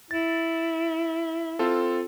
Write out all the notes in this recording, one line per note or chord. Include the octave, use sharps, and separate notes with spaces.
E4 A6
C4 F4 A4